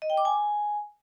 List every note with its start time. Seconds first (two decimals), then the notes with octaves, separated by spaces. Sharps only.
0.02 D#5
0.10 G5
0.17 D6
0.25 G#5